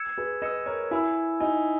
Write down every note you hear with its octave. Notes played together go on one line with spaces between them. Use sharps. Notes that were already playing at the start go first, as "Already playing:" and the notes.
Already playing: E6 G#6 C#7 E7
G#4 B4
B4 D#5 E6 G#6 C#7 E7
A#4 C#5
E4 G#5 B5 E6
D#4 G#5 B5 E6